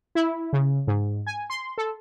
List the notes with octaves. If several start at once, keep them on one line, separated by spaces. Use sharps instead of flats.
E4
C#3
G#2
G#5
C6
A4